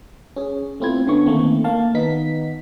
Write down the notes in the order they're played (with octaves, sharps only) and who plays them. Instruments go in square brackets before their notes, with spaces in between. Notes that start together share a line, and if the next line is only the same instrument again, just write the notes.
[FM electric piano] C#4 G#4
A3 B3 C4 E4 F4 G#6
D3 B3 C#4 C#6
D#3 A3 A#3 C4
A#3 F5 A5
D#3 B3 D#4 B6